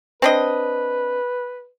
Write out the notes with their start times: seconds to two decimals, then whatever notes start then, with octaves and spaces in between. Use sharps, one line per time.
0.22 C4 D4 B4 D#5